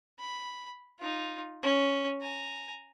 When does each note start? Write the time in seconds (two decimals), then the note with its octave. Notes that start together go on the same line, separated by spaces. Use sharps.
0.19 B5
0.99 D#4 F4
1.63 C#4
2.21 G#5 A#5